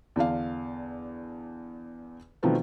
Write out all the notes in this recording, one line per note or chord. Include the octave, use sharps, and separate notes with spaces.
E2 D3 D4 F5
B2 D#3 F3 A3 B3 C4